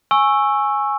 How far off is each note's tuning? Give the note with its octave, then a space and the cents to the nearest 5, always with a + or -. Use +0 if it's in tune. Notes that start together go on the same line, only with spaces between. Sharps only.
G#5 +0 C#6 -15 E6 +0